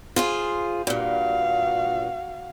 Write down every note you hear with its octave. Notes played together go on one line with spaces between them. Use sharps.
F4 G#4 C5
G2 A#2 F#4 F5